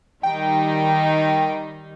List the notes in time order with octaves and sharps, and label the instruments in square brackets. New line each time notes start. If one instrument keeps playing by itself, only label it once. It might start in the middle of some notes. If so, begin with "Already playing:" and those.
[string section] D#3 G3 D#4 [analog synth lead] G5